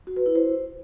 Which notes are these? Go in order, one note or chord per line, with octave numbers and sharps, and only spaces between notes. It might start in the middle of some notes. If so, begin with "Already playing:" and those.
F#4
B4
E4
C5